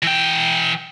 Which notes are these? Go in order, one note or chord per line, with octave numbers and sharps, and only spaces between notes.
E3 G5